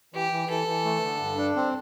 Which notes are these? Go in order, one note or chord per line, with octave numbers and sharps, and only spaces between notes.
E3 G4
E3
E3 A4
E3
A3
D3
G2
D4
C4